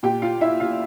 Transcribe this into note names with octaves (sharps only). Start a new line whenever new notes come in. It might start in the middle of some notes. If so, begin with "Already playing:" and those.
A#2 G4 G5
F4 F5
E4 E5
F4 F5